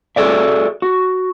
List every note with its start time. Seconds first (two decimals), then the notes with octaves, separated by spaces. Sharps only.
0.16 F#4 G#4 A4 D5 E5
0.82 F#4